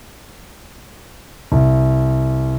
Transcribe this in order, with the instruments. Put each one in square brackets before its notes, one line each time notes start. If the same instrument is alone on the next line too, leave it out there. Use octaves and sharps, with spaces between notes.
[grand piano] C2